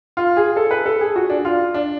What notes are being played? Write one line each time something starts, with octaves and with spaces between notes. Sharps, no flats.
F4
G#4
A4
B4
A4
G#4
F#4
D4
F4
D4